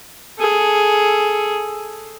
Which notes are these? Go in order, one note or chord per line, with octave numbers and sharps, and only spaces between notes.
G#4 A4